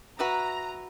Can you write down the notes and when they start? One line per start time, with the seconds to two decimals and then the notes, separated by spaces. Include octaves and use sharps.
0.19 F#4 B4 E5 A#5